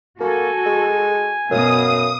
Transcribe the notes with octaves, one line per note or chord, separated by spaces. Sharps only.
A#3 F#4 A4 G#5
G#3
F#2 B2 F5 D#6